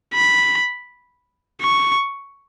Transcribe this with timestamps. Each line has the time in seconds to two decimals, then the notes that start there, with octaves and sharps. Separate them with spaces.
0.14 B5
1.61 C#6